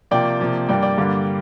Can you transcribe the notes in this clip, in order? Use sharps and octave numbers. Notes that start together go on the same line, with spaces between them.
C3 F3 A#3 D5 G5
C3 F3 A#3
G2 G3 A#3 D5 G5
D5 G5
G2 D3 G3 A#3